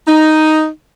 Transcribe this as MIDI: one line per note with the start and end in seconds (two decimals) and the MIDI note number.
0.07 0.68 63